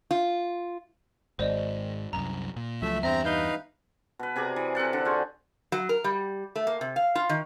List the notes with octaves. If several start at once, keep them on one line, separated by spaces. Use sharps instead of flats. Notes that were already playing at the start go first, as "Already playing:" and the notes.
F4
G#1 G#2 C5 D5 D#5
C2 F#2 A#5
A#2
C#2 F3 F#3 A3 E5
E2 G2 C4 E5 A#5
D#4 B4 F5 G6 G7
B2 B4
C3 G#4 D5 A#5
E3
C3 A4 F#5 A5
D3
F4 F#4 G#4 C5
F#3
A#4
G3
A3
A#3
C3
F5
F4
D#3